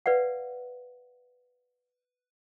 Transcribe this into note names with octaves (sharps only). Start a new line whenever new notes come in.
B4 D5 F5 F#5